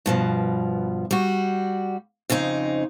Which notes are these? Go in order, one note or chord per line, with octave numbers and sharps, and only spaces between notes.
G2 B2 F3
G3 F#4
F2 C#3 C4 D#4